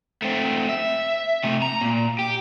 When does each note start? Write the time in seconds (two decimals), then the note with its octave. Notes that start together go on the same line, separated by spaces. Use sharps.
0.22 A3 C4
0.69 E5
1.44 C3 A3
1.62 A#5
1.81 A#2
2.19 G4